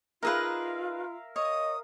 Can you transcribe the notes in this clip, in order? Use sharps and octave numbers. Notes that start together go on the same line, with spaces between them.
D#4 F4 G#4 A#4 B4 E5 F5
C#5 D#5 D#6